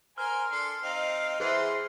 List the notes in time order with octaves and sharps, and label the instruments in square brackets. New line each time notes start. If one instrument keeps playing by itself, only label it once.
[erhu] A#4 [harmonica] C5 G#5 [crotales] F6
[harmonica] D4 A4 [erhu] C6
[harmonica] C4 D#4 [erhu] F5
[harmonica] E3 B3 [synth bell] G#4 C5 E5 [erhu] C6